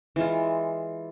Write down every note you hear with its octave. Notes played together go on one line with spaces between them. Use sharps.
E3 G#3 F4